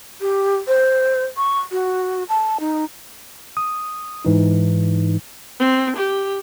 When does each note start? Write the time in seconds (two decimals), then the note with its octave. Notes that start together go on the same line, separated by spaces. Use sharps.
0.20 G4
0.67 C5
1.37 C#6
1.71 F#4
2.29 A5
2.60 D#4
3.57 D#6
4.25 G#2 E3 D#4
5.60 C4
5.97 G4